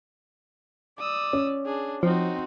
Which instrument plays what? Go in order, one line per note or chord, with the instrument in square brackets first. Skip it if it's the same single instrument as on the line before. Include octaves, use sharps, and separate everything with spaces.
[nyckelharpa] D5 [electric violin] D#6 E6
[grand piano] C#4
[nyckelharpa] D4 [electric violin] G#4
[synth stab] F3 [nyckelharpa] C4 [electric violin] D#4 F#4